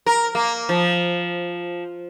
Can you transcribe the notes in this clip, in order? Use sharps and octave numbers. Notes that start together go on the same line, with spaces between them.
A#4
A#3
F3